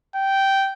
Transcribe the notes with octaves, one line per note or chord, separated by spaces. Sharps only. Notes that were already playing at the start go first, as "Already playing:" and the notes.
G5